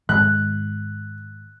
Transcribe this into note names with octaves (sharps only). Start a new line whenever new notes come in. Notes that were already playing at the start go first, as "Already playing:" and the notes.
G#2 D#3 G#3 F#6